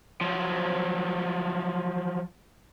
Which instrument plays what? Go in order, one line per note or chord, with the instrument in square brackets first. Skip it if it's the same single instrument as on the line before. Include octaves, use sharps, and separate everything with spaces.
[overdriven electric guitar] F3 F#3